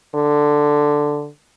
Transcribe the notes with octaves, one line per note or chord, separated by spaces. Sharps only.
D3